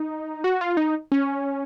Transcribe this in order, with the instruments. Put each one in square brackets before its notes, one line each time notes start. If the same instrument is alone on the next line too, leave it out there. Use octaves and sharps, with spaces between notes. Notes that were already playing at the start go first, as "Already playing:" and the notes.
Already playing: [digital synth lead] D#4
F#4
F4
D#4
C#4